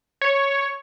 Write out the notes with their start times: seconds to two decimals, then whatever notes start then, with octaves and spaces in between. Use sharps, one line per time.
0.21 C#5